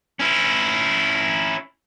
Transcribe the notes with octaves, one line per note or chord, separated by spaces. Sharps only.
C#4 E4